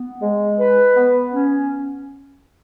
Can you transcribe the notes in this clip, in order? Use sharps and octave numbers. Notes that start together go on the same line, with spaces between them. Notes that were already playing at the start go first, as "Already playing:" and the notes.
Already playing: B3
G#3
B4
B3
C#4